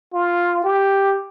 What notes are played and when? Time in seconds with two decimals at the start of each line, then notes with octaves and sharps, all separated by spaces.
0.14 F4
0.63 G4